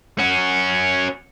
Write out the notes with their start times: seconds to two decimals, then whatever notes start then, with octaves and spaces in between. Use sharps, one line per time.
0.19 C#4 F#4